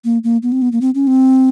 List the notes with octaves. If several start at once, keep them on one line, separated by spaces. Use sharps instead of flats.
A#3
A#3
B3
C4
B3
A#3
C4
C#4
C4